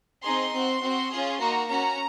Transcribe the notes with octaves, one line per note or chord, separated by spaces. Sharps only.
C4 D#4 G#4 C6
C4 F#4
C4 F#4
C#4 F4 G#4
A#3 D#4 F#4 A#5
C#4 F#4 A#5